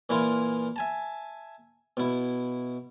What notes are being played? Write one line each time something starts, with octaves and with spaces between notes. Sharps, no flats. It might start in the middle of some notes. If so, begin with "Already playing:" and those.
A#2 E3 E4 F4
E5 G#5 A5
B2 E4